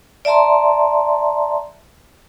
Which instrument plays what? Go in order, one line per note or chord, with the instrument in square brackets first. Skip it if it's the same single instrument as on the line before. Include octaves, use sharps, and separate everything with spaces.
[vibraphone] D5 E5 A5 A#5 C6